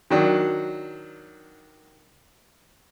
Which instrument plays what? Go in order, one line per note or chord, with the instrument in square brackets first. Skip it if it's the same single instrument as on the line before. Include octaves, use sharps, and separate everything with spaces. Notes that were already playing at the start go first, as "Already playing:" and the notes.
[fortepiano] D#3 F#3 D4